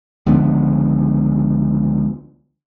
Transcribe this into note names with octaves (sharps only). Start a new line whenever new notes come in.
C#2 D3 F3 B3